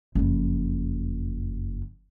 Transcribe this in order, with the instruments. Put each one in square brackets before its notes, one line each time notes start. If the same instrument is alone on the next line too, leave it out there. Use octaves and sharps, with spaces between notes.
[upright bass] F#1 F2